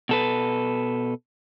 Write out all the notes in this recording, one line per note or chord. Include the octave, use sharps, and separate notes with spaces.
B2 A4 B4